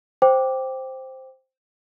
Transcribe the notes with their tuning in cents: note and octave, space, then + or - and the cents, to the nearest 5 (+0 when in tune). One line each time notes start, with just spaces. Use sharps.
C5 +0 G5 +0 D6 +0